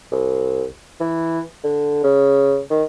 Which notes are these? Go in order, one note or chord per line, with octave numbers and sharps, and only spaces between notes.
C2
E3
D3
C#3
D#3